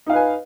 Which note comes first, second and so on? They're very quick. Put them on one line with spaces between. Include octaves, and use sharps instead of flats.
D#4 F5 B4 G#5